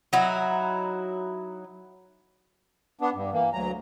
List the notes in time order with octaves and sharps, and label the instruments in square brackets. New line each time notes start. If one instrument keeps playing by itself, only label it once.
[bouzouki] F#3 D#4 E4
[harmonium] B3 D4
G2
E3 A#3
D2 F#3 A#5